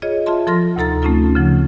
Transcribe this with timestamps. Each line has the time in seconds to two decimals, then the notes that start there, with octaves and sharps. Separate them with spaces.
0.02 F4 G#4 C#5 D#5
0.26 F4 G#4 E5 A5 C6
0.47 F3 A4 C6 F6 A#6
0.76 D2 C3 D#4 A4 A#5 A6
1.02 A3 C4 C#4 D#4 F4 A4
1.35 C#3 F3 F#5